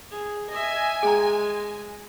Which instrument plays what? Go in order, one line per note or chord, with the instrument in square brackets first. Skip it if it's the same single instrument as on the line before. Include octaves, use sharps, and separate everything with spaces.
[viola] G#4
[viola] D#5 E5 [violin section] G#5
[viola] G#3 [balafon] G#4 G5 A#5